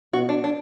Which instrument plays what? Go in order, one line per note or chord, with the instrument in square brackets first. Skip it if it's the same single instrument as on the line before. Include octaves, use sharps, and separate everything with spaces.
[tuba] B2 [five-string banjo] F#4
[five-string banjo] D4
D4